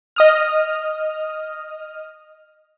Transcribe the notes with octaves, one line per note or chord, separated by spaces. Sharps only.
D#5 D#6 F6